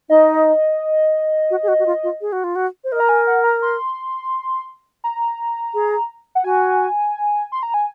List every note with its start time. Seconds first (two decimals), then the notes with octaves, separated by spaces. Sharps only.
0.09 D#4 D#5
1.50 F#4
1.63 G#4
1.68 F#4
1.79 F#4
1.86 F4
2.03 F4
2.21 G#4
2.32 F#4
2.44 F4
2.55 F#4
2.84 C5
2.92 A#4 D#5
3.00 A#5
3.09 G#5
3.27 F#5
3.44 A#5
3.62 C6
5.04 A#5
5.74 G#4
6.35 F#5
6.44 F#4 G#5
7.52 C6
7.63 A#5
7.74 G#5